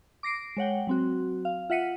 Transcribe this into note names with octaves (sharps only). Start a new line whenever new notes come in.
D6 A#6 C7 D7
G#3 C#5 F#5 G5
F#3 C4 F#4
F5
F4 E5 F#5 B6 C#7 D#7